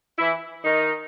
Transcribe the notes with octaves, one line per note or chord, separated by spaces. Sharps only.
E3 E4
D#3 D#4